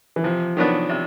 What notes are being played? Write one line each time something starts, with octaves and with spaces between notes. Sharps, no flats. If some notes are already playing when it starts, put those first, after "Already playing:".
E3
C3 F3
D#3 F#3 B3 D4
C3